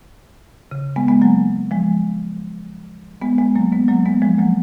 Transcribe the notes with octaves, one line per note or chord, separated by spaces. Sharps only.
C#3
G#3 B3
G#3 B3
F#3 A#3
F3 G#3
G#3 B3
G#3 B3
F#3 A#3
G#3 B3
F#3 A#3
G#3 B3
F3 G#3
F#3 A#3